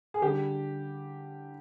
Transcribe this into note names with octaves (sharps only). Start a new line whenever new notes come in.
G#4
D3 G3 G4